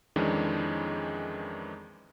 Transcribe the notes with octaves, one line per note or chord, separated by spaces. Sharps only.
F2 D#3 E3 G#3 C#4 D4